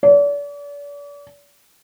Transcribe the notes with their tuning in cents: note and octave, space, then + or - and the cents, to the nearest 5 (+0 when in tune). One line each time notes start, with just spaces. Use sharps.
D5 -40